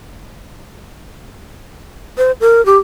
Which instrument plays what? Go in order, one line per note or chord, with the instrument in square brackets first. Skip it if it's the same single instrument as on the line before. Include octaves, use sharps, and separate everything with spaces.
[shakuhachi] C5
A#4
G4